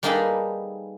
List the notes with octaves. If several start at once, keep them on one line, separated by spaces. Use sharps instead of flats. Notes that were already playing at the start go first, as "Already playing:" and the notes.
G3 A#3 D#4 G#4 A4 B4